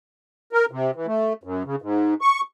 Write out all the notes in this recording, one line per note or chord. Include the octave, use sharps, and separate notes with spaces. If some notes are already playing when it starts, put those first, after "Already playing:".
A#4
C3
E3
A3
F#2
C#3
G#2
C#6